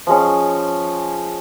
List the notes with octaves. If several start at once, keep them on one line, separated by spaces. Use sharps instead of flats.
F3 G#3 C#4